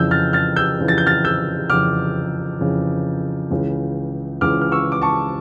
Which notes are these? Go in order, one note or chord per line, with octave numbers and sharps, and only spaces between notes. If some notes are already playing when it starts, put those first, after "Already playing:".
Already playing: F2 C#3 E3 E6 G6
F6 A6
F6 A6
E6 G6
F2 C#3 E3
A6
G6
F6 A6
E6 G6
F2 C#3 E3 D6 F6
F2 C#3 E3
C#2 C#3 E3
C#2 C#3 E3 D6 F6
F6
C#6 E6
D6
A5 C#6